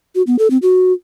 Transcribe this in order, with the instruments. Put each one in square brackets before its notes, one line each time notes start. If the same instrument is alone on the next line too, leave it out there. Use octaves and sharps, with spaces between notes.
[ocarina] F#4
B3
A4
C4
F#4